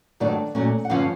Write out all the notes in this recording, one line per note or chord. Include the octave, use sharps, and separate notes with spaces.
G2 D#3 F#3 A3 D4 D5
A#2 F#3 A3 C#4
F#5
G2 D3 F3 C#4 F5